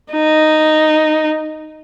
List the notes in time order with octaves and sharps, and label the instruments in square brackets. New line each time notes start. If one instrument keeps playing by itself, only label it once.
[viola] D#4